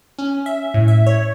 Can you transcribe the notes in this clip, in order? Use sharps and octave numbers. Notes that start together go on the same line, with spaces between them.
C#4
E5
A2
E5
C#5